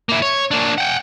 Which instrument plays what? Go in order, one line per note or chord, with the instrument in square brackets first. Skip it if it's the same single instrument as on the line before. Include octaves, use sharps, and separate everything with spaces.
[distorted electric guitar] A#3 E4
C#5
A#3 D4
F#5 G5